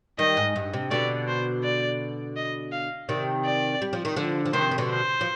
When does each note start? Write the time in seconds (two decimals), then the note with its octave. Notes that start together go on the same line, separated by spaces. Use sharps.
0.19 D#3 G3 D#5
0.37 G#2
0.56 G2
0.73 C3
0.91 B2 D3 D5
1.28 C5
1.64 D5
2.37 D#5
2.72 F5
3.09 C3 D#3 D5
3.45 D5
3.82 G3
3.93 F3
4.05 D#3
4.16 D3 F3
4.45 F3
4.53 C3 D#3 C5
4.71 D#3
4.78 B2 D3
4.90 C5
5.21 F3